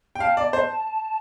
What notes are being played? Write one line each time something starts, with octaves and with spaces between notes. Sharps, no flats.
G5
F5 A5
D5
C5